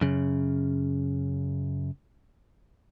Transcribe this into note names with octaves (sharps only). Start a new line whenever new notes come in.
F#2 C#3